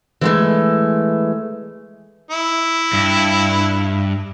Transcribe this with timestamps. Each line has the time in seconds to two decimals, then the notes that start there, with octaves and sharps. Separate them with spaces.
0.21 E3 G#3 A3
2.30 E4
2.93 G2